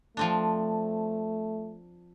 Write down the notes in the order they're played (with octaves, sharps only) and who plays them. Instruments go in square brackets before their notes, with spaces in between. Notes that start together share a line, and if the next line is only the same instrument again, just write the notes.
[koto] F3 C4 D4 [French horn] A3